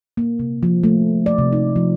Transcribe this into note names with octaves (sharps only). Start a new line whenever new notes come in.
A#3
C3
F3
A3
D5
C3
D#4
F3